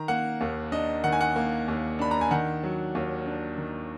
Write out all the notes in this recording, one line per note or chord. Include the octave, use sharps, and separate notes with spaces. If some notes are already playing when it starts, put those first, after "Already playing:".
Already playing: D#3 A#5
A#3 F#5
D#2
D4 D#5
D#3 F#5
G#5
F#5
A#3
D#2
D4 B5
A#5
G#5
D#3 F#5
F#3
D#2
D4
D#3